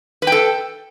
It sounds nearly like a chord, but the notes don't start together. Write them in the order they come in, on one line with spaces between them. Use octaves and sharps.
B4 G5 A4